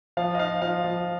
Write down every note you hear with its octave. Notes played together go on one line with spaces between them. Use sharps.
F3 F5
D#5
D#4 F5
F3 F5
F3